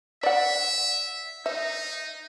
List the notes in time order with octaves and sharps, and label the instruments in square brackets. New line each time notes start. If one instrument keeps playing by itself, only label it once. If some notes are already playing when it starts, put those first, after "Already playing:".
[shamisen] D5 F#5 [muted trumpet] E5
[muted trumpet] D#4 [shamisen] E5